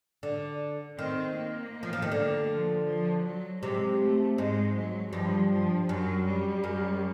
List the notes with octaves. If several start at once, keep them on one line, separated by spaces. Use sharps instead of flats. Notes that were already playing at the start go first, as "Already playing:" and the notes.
D3
D#3 C4
A#3
F3
F3
D#3
D3
F3
F3
F#3
C3 G#3
A3
G#2 G#3
F#3
G2 F3
F3
F#2 F#3
G3
F#2